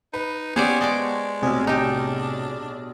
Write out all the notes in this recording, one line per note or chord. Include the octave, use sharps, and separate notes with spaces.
D#4 B4
B3 C#4 G4 G#4 C5 D5
G#3 G#4 D5 D#5 A5 C#6
B1 A2 C3 G#4 D5
D4 D#4 G4